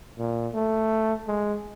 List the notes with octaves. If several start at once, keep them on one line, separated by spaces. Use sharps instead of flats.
A#2
A3
G#3